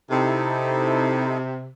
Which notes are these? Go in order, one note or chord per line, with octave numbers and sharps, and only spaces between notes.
C3 D#4 E4 A4